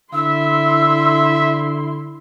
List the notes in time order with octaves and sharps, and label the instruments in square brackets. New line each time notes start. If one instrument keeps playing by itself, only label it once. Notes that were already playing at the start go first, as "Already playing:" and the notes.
[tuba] D3 [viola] E4 C6 [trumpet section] E5 [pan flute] E6